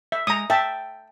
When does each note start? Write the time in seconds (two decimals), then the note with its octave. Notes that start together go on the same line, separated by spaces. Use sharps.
0.12 E5
0.27 G#3 A#5 D#6
0.50 E5 G5 A5